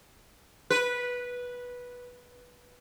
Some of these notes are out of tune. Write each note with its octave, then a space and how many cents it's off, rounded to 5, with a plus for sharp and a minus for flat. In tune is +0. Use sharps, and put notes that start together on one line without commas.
B4 -10